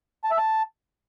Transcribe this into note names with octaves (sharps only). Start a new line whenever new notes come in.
A5
E5
A5